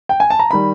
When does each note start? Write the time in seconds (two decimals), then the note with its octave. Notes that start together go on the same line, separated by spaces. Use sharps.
0.09 G5
0.20 G#5
0.30 A5
0.39 A#5
0.51 D#3 G3 B5